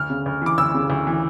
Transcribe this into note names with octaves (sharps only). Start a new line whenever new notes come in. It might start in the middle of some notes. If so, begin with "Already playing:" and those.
Already playing: D2 F6
C#3
D2
E3 D6
D2 E6
C#3
D2
E3